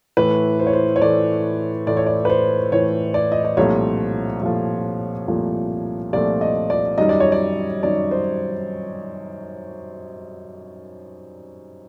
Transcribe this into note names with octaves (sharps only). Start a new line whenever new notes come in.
A2 E3 A3 B4
C5
C#5
C5
C#5
A2 E3 A3 D5
A2 E3 A3 D5
C#5
D5
B4
C5
A2 E3 A3 C#5
D5
D#5
D5
C2 A#2 F3 A3 C#5
C2 A#2 F3 A3
C2 A#2 F3 A3
C2 A#2 F3 A3 D5
D#5
D5
F#2 D#3 G3 D#5
D5
C#5
D5
F#2 D#3 G3 D5
C5